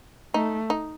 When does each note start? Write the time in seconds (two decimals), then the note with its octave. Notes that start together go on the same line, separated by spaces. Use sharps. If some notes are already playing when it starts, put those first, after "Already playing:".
0.34 A3 D#4
0.70 D#4